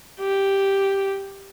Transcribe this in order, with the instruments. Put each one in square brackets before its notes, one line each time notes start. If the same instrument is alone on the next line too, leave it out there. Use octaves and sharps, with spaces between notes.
[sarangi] G4